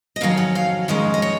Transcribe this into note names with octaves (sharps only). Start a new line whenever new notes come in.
D#5
F2 D#3 F#3 C#4 F5
F#5
F5
F2 D#3 G#3 C#4 D#5
D#5
C#5